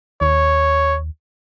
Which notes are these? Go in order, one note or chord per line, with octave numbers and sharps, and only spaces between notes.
D#2 C#5